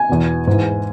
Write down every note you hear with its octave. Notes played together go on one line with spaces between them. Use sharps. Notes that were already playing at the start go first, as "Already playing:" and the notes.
Already playing: G#5
E2 B2
G#2 E3